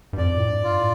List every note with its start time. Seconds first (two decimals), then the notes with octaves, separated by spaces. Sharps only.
0.13 G2
0.17 F2 D5
0.37 A2
0.49 G2
0.64 F4
0.79 A2